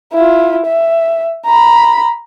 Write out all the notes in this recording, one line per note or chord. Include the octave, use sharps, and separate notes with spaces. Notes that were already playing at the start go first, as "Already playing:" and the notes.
E4 F4
E5
A#5 B5